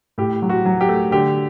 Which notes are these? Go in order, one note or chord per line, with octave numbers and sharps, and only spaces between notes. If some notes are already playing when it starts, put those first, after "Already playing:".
A2 G4
F#3
F#4
F#3
G4
A3
D3 G4